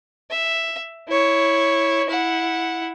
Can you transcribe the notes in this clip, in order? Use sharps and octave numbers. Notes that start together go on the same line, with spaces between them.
E5
E4 C#5
E4 F#5